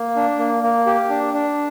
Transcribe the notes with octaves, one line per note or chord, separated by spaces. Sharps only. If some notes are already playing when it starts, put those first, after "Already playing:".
Already playing: A#3
D4
A#3
A#3
G4
D4
D4